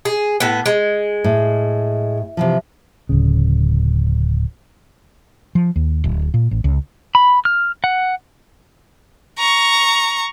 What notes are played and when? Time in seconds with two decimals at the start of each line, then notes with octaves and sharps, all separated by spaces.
0.05 G#4
0.40 A2 B3
0.66 G#3
1.24 A2
2.37 C3 E3 F3
3.09 D1 C#3
5.55 F3
5.76 D#2
6.04 D1
6.34 A#2
6.51 A1
6.64 C#2
7.15 B5
7.45 F6
7.84 F#5
9.38 A#5 C#6